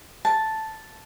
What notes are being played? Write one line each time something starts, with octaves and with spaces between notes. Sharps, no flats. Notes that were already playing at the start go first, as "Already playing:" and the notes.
A5